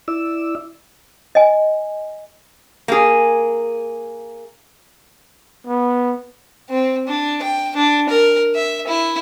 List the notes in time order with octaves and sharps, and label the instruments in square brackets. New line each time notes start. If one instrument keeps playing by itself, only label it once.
[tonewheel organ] E4 D5 E6
[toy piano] D#5 G#5
[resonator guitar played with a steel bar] A#3 G#4
[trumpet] B3
[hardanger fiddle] C4
D4
G5
D4
A#4
E5
E4